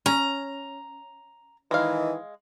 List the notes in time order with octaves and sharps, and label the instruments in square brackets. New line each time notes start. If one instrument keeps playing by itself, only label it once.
[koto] C#4 [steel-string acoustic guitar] A#5
[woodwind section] D#3 E3 [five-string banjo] G#3 F5